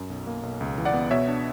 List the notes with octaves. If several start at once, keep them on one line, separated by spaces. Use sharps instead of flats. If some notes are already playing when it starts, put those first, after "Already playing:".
Already playing: F#2
B1
A#3
B1
C#2
E3
D5 F#5
B3
B2 C#5 E5
D4